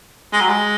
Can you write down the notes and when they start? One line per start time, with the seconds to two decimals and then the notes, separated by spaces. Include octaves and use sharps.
0.32 G#3
0.40 F#3
0.49 G#3